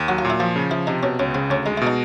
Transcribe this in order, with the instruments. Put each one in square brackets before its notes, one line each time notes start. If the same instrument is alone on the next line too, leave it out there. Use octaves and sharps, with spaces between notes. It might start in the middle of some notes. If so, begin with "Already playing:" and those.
Already playing: [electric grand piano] D#2
[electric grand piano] F#3 [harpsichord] F#4
[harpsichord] F4
[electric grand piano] A#2
[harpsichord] E4
[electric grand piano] F3 [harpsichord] F4
[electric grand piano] C#3
[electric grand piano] F3 [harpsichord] E4
[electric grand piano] C3 [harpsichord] D#4
[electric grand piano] B2 [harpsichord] C#4
[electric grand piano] C#2 [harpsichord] C#4
[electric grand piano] C#3 [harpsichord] C4
[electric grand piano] D2 [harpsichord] C#4
[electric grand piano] G#3 [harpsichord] D#4
[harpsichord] E4
[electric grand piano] B2
[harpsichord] D#4